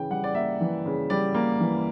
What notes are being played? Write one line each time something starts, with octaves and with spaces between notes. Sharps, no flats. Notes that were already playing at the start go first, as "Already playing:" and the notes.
Already playing: C#3 E3 G5
G3 F#5
D5
A#3 E5
E3
C#3
G3 D5
A#3
E3